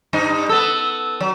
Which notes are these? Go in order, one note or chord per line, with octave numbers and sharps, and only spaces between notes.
G2 D#4
B3 A4 E6
F#3